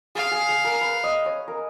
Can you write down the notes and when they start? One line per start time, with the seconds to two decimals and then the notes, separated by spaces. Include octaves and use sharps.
0.15 G#4 F5
0.31 G#4
0.49 G#4
0.65 A#4
0.81 B4
1.04 D#5
1.26 C#5
1.48 A#4